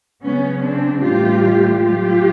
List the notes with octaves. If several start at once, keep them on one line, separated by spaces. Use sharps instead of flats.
C#3 F#3 B3 C#4
C4 D4
A2 E3 G3 F4 G4
A2 F#3 F4 G4